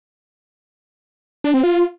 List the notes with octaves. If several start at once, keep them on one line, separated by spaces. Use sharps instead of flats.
D4
C4
F4